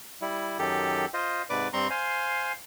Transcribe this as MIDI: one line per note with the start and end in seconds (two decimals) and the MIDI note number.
0.21 0.58 55
0.21 0.58 64
0.59 1.06 42
0.59 1.06 51
0.59 1.06 67
0.59 1.06 69
1.14 1.42 65
1.14 1.42 72
1.14 1.42 75
1.50 1.68 44
1.50 1.68 48
1.50 1.68 71
1.50 1.68 74
1.50 1.68 86
1.73 1.88 43
1.73 1.88 55
1.73 1.88 60
1.73 1.88 82
1.73 1.88 84
1.73 1.88 85
1.90 2.52 72
1.90 2.52 77
1.90 2.52 80